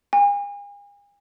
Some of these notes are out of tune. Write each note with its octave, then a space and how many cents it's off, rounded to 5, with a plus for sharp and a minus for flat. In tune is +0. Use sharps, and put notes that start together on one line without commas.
G#5 -40